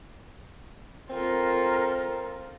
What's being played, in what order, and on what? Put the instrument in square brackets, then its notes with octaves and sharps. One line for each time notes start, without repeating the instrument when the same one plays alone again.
[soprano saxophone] C4 [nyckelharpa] F4 A4 [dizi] A#4